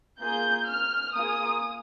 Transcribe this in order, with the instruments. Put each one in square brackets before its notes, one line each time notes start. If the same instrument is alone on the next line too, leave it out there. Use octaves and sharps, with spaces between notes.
[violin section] A#3 F4 G#4 G6
F6
A#3 F4 G#4 D#6